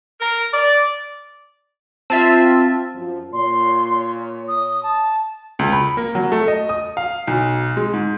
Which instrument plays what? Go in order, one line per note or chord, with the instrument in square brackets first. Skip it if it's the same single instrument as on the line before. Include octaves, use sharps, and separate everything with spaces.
[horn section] A#4
D5
[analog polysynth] C4 F4 E5 [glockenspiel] A5 A6
[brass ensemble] F#2 F3
[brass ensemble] A#2 C#5 [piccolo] C6
[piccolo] D#6
A5
[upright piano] C#2
B5
A#3
F#3
A3
D#5
D#6
F5
B1
G#3
G#2